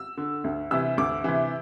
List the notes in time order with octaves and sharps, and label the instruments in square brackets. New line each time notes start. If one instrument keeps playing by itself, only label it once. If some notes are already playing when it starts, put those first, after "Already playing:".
Already playing: [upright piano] E6
D3
D2
C3 E3 E6
D2 D6
C3 E3